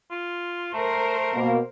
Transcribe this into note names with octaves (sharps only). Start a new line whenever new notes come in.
F4
A3 A#4 C5
B2 A#3